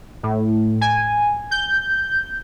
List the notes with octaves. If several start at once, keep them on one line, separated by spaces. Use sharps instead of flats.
A2
G#5
G6